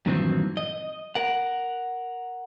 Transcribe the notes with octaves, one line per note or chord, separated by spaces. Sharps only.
G2 A#2 D#3 E3 F#3 C4
D#5
A#4 F#5